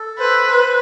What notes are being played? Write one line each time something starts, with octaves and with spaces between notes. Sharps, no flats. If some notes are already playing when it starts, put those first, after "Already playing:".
Already playing: A4
B4 C5
C5